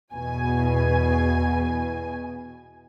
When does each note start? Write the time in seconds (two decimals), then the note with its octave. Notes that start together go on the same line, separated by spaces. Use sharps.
0.13 E2 B2 G#5